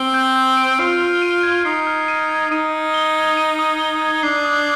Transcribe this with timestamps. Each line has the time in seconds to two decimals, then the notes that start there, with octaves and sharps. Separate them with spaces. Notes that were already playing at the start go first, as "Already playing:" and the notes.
Already playing: C4 D7 G7
0.14 G6
0.36 G6
0.57 D7
0.79 F4 C7
1.00 F6
1.22 D#7
1.43 G#6
1.65 D#4 C7
1.87 F6
2.08 D#7
2.29 G#6
2.51 D#4 D#7
2.72 D#6
2.94 G7
3.16 G#6
3.37 D#7
3.59 D#6
3.80 G7
4.02 G#6
4.23 D4 C7
4.45 D#6